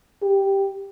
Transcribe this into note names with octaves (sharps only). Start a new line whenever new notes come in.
G4